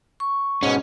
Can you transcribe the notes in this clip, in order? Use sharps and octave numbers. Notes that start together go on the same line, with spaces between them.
C#6
G#2 B2 C#4